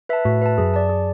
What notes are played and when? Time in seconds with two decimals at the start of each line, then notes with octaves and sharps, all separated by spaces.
0.09 B4 E5 A5
0.25 A2 F#4
0.42 B4 E5 A5
0.58 F#2 G#4
0.74 D5 A5
0.90 G#4